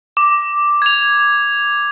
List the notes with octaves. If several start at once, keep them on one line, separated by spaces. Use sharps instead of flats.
D6
G#6 F7